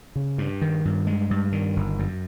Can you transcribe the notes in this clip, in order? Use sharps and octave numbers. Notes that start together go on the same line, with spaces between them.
C#3
G2
D#3
G2
G#3
G2
D#3
G1
F#2